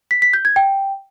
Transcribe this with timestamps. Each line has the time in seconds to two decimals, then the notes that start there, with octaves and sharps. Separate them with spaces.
0.11 B6
0.22 B6
0.33 G6
0.45 G#6
0.56 G5